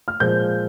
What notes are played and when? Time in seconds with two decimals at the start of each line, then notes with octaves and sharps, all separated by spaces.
0.08 F6
0.20 A#2 F3 G#3 G6